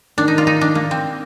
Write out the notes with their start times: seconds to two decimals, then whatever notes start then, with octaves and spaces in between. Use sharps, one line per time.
0.18 D#3 D4
0.28 D#4
0.38 F4
0.47 D#4
0.61 D4
0.75 A#3
0.91 C4